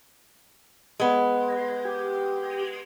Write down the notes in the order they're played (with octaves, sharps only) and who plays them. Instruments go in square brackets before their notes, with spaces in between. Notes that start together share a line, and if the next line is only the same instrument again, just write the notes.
[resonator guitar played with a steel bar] G#3 B3
[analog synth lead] G4